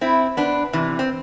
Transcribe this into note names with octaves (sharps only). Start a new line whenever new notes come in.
C4 E4
B3 D4
C3 E3
C4